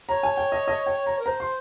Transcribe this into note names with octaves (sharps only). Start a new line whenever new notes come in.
C#5 A#5
G#5
G5
D#5
D#5
G5
A#5
A#4
C5 A#5
C6